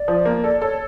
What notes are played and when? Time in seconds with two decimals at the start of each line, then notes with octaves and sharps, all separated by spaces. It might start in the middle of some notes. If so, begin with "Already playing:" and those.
Already playing: D5
0.08 F3
0.25 A#3
0.44 A4 D5
0.62 A4 C#5